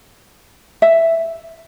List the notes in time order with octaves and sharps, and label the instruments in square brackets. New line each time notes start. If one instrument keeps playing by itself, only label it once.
[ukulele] E5